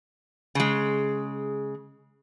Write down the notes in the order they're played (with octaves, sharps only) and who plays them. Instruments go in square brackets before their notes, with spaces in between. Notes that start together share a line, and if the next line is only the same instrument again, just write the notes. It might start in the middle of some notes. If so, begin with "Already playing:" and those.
[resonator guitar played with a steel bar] C#3 G#3